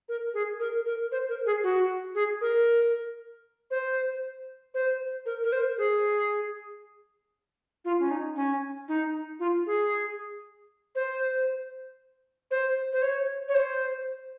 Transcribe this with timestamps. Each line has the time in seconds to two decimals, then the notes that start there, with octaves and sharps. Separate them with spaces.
0.09 A#4
0.34 G#4
0.60 A#4
0.86 A#4
1.12 C5
1.29 A#4
1.46 G#4
1.63 F#4
2.15 G#4
2.41 A#4
3.71 C5
4.74 C5
5.26 A#4
5.44 A#4
5.52 C5
5.78 G#4
7.85 F4
7.99 C#4
8.11 D#4
8.36 C#4
8.88 D#4
9.39 F4
9.66 G#4
10.95 C5
12.51 C5
12.93 C5
13.02 C#5
13.48 C#5
13.55 C5